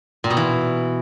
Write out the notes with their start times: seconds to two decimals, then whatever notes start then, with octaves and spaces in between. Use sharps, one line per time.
0.24 A#2
0.30 B2
0.37 E3